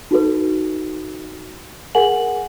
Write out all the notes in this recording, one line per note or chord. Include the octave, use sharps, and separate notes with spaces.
D#4 F#4 A4 B4
G#4 A#4 F#5 G#5 F#7